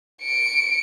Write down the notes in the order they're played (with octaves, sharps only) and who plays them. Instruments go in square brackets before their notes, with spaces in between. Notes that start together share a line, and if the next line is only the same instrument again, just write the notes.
[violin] C#7 D7